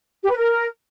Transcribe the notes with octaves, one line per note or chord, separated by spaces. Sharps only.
G4
B4
A#4